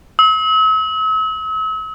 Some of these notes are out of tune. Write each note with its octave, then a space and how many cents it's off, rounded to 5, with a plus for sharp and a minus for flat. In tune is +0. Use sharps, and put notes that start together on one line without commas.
E6 -45